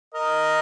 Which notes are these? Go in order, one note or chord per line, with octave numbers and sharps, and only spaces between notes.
A#4 D#5